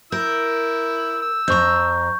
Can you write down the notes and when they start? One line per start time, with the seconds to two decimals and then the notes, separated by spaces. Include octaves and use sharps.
0.12 E4 A#4 E6 G6
1.22 E6
1.48 F2 A#5 C#6 G6